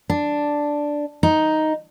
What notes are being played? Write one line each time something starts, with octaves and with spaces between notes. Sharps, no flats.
D4
D#4